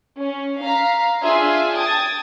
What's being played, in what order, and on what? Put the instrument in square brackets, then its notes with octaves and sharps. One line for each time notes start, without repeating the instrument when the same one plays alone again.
[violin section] C#4
F5 A#5 B6
D4 F4 G#4 E5 G#5 C6
G5 A5 D#6 G#6 A6